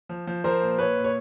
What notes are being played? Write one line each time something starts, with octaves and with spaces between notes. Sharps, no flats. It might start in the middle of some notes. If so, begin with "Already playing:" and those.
F3
F3
F3 A#4 C5
A#2
A#2 B4 C#5
A#2
C#5